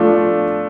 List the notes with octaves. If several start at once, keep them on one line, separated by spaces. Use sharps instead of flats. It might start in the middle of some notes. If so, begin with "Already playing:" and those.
Already playing: F3 A3 D4 F4